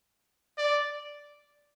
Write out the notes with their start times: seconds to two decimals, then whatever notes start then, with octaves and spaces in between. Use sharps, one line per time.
0.58 D5